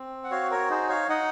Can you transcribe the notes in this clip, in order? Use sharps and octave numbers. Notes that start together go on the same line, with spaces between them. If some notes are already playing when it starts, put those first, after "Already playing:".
Already playing: C4
F#5
F#4 C#5 F5
A#4 C#5
D#4 G#4 C5
C#5 F5
D#4 D#5 F#5